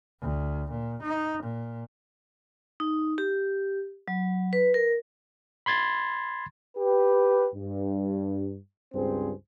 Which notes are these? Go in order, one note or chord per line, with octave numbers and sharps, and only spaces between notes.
D2
A#2
D#4
A#2
D#4
G4
F#3
B4
A#4
B5 C6 G#6 A6
G4 B4
G2
C#2 G2 C4 G#4 C5